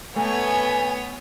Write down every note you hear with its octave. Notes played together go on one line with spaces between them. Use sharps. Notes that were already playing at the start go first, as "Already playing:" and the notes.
A3 B3 C#5 G#5